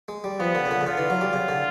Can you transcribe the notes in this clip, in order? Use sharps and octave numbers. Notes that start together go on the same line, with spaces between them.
G#3
G3
F3 B3
D3
C#3
D3
C#3
D3 F4
E3
F#3
G3
C#3
D3